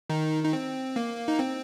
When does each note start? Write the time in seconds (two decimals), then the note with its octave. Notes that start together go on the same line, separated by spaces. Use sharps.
0.10 D#3 D#4
0.44 D#4
0.53 C4
0.96 A#3
1.28 D#4
1.39 C4